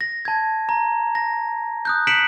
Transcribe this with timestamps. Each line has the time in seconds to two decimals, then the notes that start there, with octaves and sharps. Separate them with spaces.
0.01 A#6
0.25 A5 G#6
0.69 A#5
1.15 A#6
1.85 D#6 F#6 G6
2.07 F#6 B6 C#7 D7 E7 F#7